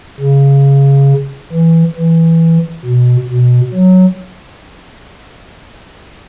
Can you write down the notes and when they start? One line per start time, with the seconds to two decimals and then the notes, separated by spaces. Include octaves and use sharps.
0.20 C#3
1.53 E3
1.96 E3
2.86 B2
3.30 B2
3.74 F#3